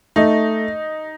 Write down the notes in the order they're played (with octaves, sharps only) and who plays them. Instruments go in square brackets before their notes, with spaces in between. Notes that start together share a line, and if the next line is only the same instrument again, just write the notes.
[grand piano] A3 [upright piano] D#4